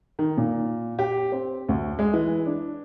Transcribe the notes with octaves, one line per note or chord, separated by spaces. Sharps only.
D#3
A#2
G4
C4
D2
G#3
E3
D4